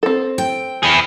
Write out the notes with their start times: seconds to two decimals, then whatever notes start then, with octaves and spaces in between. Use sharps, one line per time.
0.03 C4 A4
0.38 G5
0.83 E4 G#4